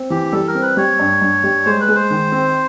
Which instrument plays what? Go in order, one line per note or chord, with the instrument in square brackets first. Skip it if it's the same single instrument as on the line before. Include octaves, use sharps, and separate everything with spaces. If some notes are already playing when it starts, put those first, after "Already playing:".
Already playing: [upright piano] C4
[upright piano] E3 [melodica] G4
[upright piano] G3 [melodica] A4
[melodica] A#4
[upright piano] C4
[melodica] B4
[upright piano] G3 [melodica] C#5
[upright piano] G2
G2
G3
[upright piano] G#3 [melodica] C5
[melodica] B4
[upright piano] G#3
[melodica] C5
[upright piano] D#3
C4